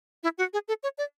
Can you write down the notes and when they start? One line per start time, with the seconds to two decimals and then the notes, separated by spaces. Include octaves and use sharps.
0.23 E4
0.38 F#4
0.53 G#4
0.68 A4
0.83 C#5
0.98 D5